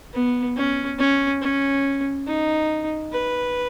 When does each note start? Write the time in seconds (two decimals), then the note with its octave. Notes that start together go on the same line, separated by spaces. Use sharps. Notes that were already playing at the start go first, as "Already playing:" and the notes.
0.13 B3
0.56 C#4
0.99 C#4
1.42 C#4
2.26 D#4
3.12 B4